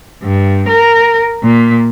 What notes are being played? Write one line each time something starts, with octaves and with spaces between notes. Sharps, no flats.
G2
A#4
A#2